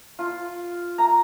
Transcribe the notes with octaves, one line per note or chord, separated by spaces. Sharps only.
F4
A#5